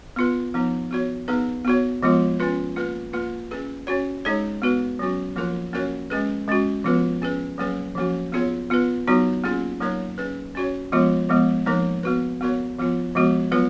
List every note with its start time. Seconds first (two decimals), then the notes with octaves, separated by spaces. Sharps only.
0.16 B3 F4 B4
0.54 F3 B3 D#4
0.91 B3 F#4 C#5
1.28 B3 D#4 G#4 B4
1.65 B3 F#4 C#5
2.03 F3 G#3 B3 F4
2.40 C#4 F4 B4
2.76 A#3 F4 B4
3.13 A#3 F4 B4
3.51 C#4 G#4 B4
3.87 C#4 F#4 C#5
4.25 G#3 D#4 G#4 C#5
4.62 B3 F#4 B4
4.99 F#3 C#4 F#4
5.36 F3 A#3 F4 A#4
5.73 A#3 C#4 F#4 A#4 C#5
6.10 G#3 C#4 G#4 B4
6.48 G#3 C#4 F#4
6.84 F3 B3 F4 B4
7.22 C#4 G#4 B4
7.58 F#3 A#3 C#4 G#4 B4
7.95 F3 A#3 C#4 F#4
8.32 B3 F4 G#4 C#5
8.70 B3 F4 B4
9.07 F#3 B3 D#4 F#4
9.44 A#3 C#4 F4 G#4
9.81 F#3 A#3 D#4 A#4 C#5
10.18 C#4 G#4 B4
10.55 C#4 F#4 C#5
10.92 F3 G#3 B3 F4
11.29 F3 G#3 B3
11.66 F3 A#3 D#4 A#4
12.03 B3 F#4 B4
12.41 B3 F#4 A#4 C#5
12.79 F3 B3 F4
13.15 F3 G#3 B3 F#4
13.52 F#3 B3 F4 B4